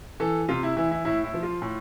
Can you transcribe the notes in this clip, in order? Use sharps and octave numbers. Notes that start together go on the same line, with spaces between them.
E3 A4
C3 F4
E4
E3 E4
E4
A2 E4
E4
F3
F4
A2